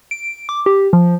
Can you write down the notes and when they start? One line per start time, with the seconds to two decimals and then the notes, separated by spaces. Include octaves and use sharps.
0.11 D7
0.49 D6
0.66 G4
0.93 F3